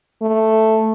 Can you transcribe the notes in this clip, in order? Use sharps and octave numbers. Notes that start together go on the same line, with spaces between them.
A3